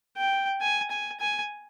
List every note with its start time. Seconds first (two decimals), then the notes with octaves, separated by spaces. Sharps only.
0.17 G5
0.61 G#5
0.91 G#5
1.20 G#5